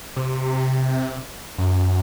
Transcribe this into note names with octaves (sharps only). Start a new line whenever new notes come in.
C3
F#2